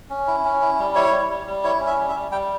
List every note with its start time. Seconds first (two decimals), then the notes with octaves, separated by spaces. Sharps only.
0.10 C#4
0.27 E4
0.45 C#4
0.61 E4
0.79 G3
0.95 E4 C#5
1.12 G3
1.30 G3
1.46 G3
1.64 E4 C#5
1.80 C#4
1.86 E5
1.98 G3
2.09 E5
2.15 G3
2.31 G3 G5